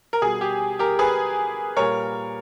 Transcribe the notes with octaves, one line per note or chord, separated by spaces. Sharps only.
A#4
B2 G3 G#4
G4
G4 A#4
G#4 B4
A#2 G3 A#4 C#5